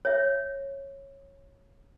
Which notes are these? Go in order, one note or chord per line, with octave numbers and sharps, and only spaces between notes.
C#5 E5